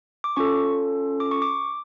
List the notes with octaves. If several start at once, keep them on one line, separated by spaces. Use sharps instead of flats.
D6
C#4 F4 A4 C#6
D6
C#6
D6